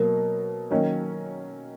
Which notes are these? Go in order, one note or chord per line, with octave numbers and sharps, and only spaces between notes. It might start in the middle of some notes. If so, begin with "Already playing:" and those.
Already playing: B2 F#3 A#3 A#4
D#3 F#3 A#3 C#4